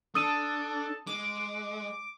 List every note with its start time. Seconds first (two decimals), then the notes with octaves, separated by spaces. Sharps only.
0.15 D4 A4 A5 D#6 D#7
1.07 G#3 D6